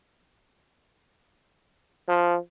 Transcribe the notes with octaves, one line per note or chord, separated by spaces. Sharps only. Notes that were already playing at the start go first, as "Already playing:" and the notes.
F3